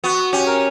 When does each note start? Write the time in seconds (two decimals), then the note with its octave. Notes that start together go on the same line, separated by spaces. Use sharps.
0.04 B3 F#4
0.33 C#4 G4
0.47 A#4